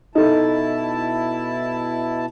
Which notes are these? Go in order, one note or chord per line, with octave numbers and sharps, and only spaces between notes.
B2 D#4 E4 A4 A5